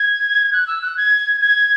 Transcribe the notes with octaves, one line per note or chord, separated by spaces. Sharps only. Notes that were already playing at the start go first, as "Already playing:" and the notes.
Already playing: G#6
F#6
E6
F#6
G#6
G#6